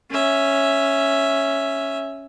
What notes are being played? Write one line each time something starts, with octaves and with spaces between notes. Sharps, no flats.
C#4 E5